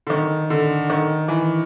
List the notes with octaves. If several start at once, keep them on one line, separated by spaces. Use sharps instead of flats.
D3
D#3
D3
D#3
E3